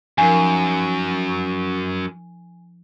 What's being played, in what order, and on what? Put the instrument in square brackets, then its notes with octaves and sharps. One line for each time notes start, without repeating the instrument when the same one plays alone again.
[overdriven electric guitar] F#2 [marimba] F3 D#4 A#4 [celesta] G#5